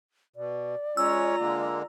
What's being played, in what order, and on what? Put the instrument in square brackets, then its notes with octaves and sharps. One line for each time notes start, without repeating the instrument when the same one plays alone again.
[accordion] B2 [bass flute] D5
[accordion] G#3 C#4 C#5 [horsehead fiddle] F4 A#5 [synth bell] E6
[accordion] D3 G#3 A#3